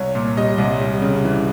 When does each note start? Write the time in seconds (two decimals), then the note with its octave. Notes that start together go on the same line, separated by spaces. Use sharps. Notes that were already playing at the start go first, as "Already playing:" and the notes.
Already playing: C2 C#5
0.15 A#2
0.37 G3 D#5
0.58 C2
0.81 G3
1.02 C#3
1.24 E3